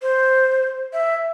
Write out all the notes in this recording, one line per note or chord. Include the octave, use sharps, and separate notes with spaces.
C5
E5